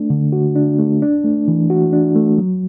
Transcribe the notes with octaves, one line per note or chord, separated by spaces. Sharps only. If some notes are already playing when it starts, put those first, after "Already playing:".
Already playing: A3 D4
D3
F#4
D4
A3
D4
A3
E3
F#4
D4
A3
F#3